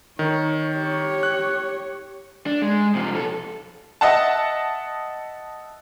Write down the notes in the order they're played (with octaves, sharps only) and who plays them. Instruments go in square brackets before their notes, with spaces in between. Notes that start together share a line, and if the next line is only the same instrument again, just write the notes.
[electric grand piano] D#3 [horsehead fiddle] C#5
[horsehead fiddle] G4 C#5
[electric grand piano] F#6
[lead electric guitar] D4
G#3
C3 F3
B1 A4
[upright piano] D#5 E5 F#5 A5